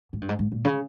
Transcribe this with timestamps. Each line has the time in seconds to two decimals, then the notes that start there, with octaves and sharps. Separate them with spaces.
0.13 G#2
0.21 G2
0.29 G#2
0.39 G#2
0.52 A#2
0.65 C#3